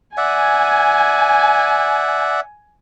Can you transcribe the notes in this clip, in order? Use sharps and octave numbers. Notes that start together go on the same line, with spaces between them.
D5 E5 F#5 G#5